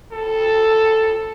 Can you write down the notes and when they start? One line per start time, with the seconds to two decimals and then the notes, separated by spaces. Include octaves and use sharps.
0.12 A4